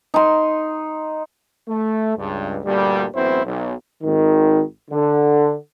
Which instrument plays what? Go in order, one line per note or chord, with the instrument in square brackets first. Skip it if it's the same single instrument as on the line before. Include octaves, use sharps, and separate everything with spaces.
[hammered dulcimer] D#4 C6
[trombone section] A3
C#2 G2
D2 G2 A#2 G3
A1 F#2 B3 C4 E4 C5
B1
G#1 D#3
D3